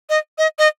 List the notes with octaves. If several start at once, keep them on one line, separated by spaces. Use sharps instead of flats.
D#5
D#5
D#5